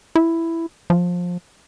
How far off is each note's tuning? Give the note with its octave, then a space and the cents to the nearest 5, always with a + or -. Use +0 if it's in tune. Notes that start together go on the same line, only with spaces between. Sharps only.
E4 +5
F3 +20